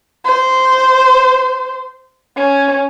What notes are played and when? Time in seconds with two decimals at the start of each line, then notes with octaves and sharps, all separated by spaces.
0.25 C5
2.37 C#4